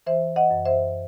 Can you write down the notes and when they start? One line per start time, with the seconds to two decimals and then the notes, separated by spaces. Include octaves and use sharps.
0.06 E3 C5 E5
0.36 D#5 F#5
0.51 F#2
0.65 C5 E5